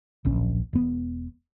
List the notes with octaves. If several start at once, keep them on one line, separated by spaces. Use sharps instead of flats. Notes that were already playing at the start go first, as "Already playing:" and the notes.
D1 A#1 C#4
E1 B3